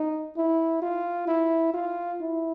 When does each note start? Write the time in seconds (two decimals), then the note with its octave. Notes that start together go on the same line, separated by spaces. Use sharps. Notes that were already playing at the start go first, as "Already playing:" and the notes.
Already playing: D#4
0.36 E4
0.82 F4
1.27 E4
1.73 F4
2.21 E4